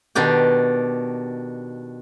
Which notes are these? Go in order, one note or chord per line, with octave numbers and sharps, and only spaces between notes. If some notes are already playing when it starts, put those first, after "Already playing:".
B2 D#3 D4 G4